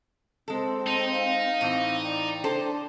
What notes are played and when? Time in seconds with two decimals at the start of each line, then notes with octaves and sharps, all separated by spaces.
0.48 G#3 C4 A4
0.87 D#4
1.11 F5
1.61 A2 E3 C4
2.03 D5 G5
2.44 D4 A4 C5